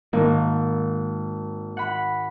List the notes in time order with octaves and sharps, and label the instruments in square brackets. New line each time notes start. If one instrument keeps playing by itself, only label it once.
[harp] G#1 [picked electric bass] D#3 A#3
[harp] F#5 B5